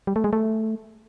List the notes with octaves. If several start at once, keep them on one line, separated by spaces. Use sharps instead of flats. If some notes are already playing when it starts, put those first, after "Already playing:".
G3
A3
G#3
A3